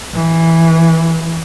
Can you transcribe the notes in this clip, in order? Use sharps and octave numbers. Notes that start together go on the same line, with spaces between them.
E3